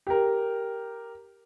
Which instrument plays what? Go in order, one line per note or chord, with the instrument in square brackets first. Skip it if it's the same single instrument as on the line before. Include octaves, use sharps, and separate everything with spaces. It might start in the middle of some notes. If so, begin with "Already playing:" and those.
[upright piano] G4 A#4